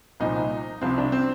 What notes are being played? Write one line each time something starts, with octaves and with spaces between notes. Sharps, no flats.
C2 A#2 F3 D#4
C2 C3 F3 C4
D4
C4